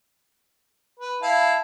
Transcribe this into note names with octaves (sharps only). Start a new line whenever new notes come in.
B4
E4 F5 A5